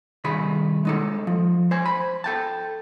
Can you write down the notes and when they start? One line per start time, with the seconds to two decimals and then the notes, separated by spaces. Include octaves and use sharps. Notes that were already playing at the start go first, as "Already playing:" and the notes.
0.24 C2 D#3 G#4 B5
0.85 G#3 D#4 A4
1.27 F3
1.71 C5 G#5
1.86 B5
2.24 A4 G5 A5